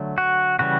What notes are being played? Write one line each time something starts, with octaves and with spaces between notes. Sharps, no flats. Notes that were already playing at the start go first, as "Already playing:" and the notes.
Already playing: D3 F#3 A3
F#4
C#3 E3 G3 F#4